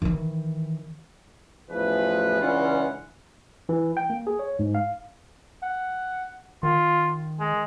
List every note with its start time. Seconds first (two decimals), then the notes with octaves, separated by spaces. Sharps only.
0.02 D#3 E3
1.70 A1 E2 E3 F3 B4
2.40 C#2 E3 C#4 D4 F4 F#5
3.69 E3
3.97 G5
4.10 A#3
4.27 G#4
4.39 C#5
4.59 G#2
4.75 F5
5.63 F#5
6.63 D#3 F4
7.40 G#3